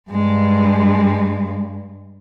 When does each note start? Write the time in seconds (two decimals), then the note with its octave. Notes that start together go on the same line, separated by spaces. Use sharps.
0.10 G2 G#3